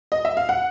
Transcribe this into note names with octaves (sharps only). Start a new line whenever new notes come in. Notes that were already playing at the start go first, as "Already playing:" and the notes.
D#5
E5
F5
F#5